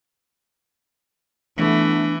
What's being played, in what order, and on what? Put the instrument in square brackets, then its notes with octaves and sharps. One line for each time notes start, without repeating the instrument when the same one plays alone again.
[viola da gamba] E3 [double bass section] A3 B3 [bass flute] D4